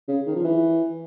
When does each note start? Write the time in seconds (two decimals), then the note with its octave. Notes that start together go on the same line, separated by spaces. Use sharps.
0.08 C#3
0.26 D#3
0.36 F3
0.44 E3